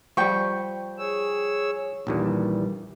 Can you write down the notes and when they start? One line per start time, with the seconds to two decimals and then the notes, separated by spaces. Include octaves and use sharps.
0.17 F3 G3 G5 C#6
0.98 G#4 C#5 E6
2.07 A#1 D#2 A#2 E3 G3